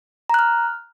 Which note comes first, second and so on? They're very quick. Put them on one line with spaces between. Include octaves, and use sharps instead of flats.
A#5 F#6 F6